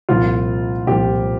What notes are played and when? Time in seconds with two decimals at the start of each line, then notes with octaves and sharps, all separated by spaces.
0.09 C2 A#2 F3 F4
0.87 C2 A#2 F3 G4